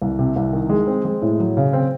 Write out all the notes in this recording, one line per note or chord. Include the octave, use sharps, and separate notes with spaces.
C2
C3
C2
D#3
G#3
C4
G#3
A2
F#3
C#3
C4